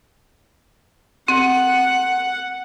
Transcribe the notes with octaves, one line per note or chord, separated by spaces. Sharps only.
C4 F#5